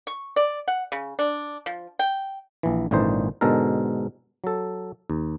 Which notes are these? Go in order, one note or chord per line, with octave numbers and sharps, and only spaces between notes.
C#6
D5
F#5
C#3
D4
F3
G5
A#1 E3
G#1 A#2 D3 E3 D#4 C5
G#2 B2 D3 G#3 A4 A#4
F#3 A4
D#2